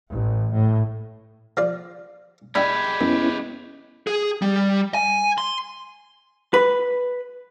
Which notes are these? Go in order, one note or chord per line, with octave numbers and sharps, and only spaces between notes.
A1
A2
F3 F4 D5
G#3 D4 E4 G4 G5 B5 G#6 B6
F#2 B3 C#4 E4
G#4
G3
G#5
C6
B4